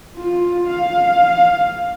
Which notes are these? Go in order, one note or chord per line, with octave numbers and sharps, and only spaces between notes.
F4
F5